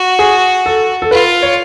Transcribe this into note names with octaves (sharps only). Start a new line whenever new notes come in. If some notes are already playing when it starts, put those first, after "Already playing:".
Already playing: F#4
G#4
A4
A4
F4 B4
C#5